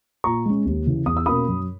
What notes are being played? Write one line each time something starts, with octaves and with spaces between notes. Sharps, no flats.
A#2 A#5 C#6
G#3 C#4
D#2
C#3 E3
E2 D#6
E6
B2 A#3 C#4 B5 D#6
F#2